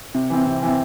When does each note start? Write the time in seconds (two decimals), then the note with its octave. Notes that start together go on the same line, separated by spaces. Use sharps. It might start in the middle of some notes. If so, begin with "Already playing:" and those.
0.15 C3
0.30 E3 C4
0.46 C3
0.62 E3 C4